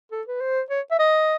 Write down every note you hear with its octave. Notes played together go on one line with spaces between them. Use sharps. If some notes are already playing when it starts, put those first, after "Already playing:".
A4
B4
C5
C#5
E5
D#5